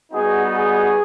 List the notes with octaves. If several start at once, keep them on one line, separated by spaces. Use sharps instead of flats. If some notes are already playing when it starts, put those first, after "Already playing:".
G3 B3 D#4 F#4 G#4
G#4